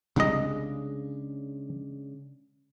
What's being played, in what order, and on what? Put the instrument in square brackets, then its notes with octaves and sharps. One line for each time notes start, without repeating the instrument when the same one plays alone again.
[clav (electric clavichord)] C2 D#5 [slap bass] C#3 G#3 D4